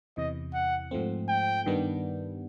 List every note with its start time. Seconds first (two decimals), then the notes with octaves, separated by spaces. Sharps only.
0.17 E2 C3 E3 D#5
0.54 F#5
0.91 G#2 F3 A3 C4
1.28 G5
1.66 G2 D#3 G3 B3 D4